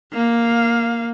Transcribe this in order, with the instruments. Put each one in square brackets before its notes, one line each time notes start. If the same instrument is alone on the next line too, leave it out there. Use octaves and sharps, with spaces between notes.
[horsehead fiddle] A#3 F5